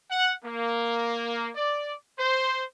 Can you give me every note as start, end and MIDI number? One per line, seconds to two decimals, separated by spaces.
0.11 0.33 78
0.45 1.50 58
1.56 1.95 74
2.19 2.63 72